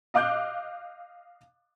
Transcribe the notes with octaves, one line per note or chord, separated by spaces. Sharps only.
D#5 F5 D6 F#6 G6